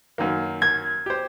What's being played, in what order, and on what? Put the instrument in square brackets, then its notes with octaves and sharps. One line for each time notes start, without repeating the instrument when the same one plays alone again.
[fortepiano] F#2 D#3 A#3
[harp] G#6
[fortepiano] G4 C5